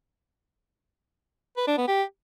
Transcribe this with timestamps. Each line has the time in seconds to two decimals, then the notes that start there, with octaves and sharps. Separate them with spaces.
1.57 B4
1.67 D4
1.78 B3
1.88 G4